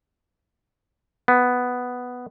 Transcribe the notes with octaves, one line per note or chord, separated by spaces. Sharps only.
B3